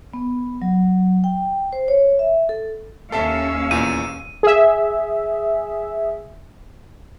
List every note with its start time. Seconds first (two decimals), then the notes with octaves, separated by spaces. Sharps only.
0.14 B3
0.62 F#3
1.24 G5
1.73 C5
1.88 C#5
2.19 E5
2.49 A4
3.12 D#2 C#4 A4 E5 F5 A5 E6
3.71 E2 A#2 D#7
4.43 G#4 E5